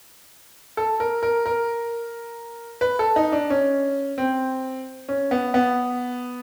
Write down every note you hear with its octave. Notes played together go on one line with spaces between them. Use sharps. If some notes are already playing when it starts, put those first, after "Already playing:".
A4
A#4
A#4
A#4
B4
A4
D#4
D4
C#4
C4
C#4
B3
B3